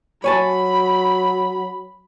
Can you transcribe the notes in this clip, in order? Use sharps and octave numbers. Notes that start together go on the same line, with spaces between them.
F#3 C#5 G#5 A5 B5